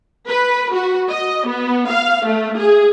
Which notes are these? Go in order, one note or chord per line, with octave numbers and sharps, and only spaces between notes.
B4
F#4
D#5
B3
F5
A3
G#4